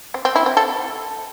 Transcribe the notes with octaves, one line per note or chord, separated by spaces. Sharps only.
C4
C4
E4
C4
A4